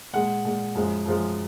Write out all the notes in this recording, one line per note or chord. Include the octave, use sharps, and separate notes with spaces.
A#2 G#3 F#5
A#2 G#3
F#2 F3 G#3
F#2 F3 G#3